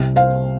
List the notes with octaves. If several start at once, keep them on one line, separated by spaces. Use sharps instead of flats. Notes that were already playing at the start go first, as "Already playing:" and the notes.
Already playing: C2 C3 G3
C5 F5